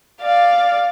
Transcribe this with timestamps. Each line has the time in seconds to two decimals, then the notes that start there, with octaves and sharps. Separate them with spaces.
0.21 D5 F5